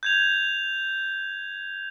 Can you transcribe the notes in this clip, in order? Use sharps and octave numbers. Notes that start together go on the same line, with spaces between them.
G6 G#6 F7